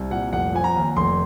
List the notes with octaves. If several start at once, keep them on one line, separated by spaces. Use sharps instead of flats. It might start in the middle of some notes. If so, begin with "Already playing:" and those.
Already playing: C2
A#2 F#5
F1 F#5
F3 G#5
A#5
D#2
F1 C6